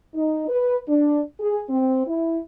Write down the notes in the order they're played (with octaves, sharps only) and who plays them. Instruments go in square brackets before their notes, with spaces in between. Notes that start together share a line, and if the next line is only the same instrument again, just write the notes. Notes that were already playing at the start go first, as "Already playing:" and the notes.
[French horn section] D#4
B4
D4
G#4
C4
E4